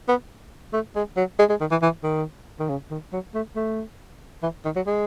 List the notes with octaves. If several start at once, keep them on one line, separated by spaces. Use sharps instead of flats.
B3
A3
G#3
F#3
G#3
G#3
D#3
E3
E3
D#3
D#3
C#3
D#3
F#3
A3
A3
E3
D#3
F#3
G#3